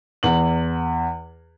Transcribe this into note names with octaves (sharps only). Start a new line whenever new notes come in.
E2 F#7